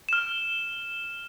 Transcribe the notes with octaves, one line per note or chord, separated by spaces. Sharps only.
F6 E7